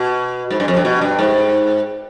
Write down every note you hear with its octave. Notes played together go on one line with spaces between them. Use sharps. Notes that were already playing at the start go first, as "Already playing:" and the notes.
Already playing: B2
G#2
G2
F2
G2
B2
G2
G#2